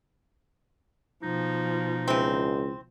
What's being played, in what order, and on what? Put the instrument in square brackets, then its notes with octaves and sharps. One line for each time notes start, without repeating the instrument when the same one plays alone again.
[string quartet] B2 F3 [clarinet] D#4
[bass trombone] C#2 [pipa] E3 C4